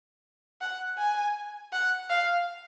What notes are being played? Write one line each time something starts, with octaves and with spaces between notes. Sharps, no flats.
F#5
G#5
F#5
F5